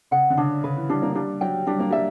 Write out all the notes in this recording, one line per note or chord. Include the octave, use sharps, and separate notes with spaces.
C#3 F#5
D3
C#3 D4
C#3 B4
E3
G3 D4
A#3
G3 D4
F#3 G5
G3 D4
A#3
G3 E5